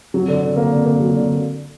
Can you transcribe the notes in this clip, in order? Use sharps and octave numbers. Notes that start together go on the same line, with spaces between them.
F#3
D3
D3
A#3
D3
A#3
F#3
D3